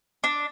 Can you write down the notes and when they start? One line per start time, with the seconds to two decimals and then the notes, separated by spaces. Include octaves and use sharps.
0.24 D4